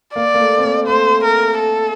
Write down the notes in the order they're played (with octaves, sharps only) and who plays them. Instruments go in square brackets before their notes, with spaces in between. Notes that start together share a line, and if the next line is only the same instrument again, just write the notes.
[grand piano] A#3 [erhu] D5
[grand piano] A#3
A3
C4
A#3
[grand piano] A3 [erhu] C5
[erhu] A#4
A4